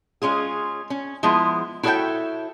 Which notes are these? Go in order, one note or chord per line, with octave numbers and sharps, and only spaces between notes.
G#3 C#4 F4 G#4
C#4
F3 G#3 B3 E4
E4 F#4 A4 C#5 E5 G5